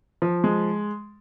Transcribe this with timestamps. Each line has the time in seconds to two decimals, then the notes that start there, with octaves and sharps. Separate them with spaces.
0.22 F3
0.44 G#3